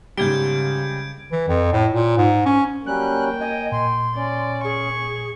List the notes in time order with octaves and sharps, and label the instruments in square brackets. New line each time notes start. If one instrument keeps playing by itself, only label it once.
[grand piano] G#2 G7 [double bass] C#3 [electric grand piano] G3 [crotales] G6 G#6 D7
[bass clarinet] E3
F2
A2
A#2
G#2
C#4
[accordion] F#3 G3 C#4 [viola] A#3 G5 [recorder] F#6
[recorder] D#5 [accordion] G#5
[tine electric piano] A#2 [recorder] C6
[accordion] C#4 [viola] D5
[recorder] G#4 [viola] C#6